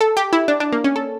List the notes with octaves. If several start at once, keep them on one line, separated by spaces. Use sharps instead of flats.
A4
G4
E4
D4
D4
A#3
C#4
A4